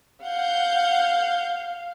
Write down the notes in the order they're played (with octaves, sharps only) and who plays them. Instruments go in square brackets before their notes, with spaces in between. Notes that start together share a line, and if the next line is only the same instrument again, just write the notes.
[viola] F5 [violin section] F#5 G6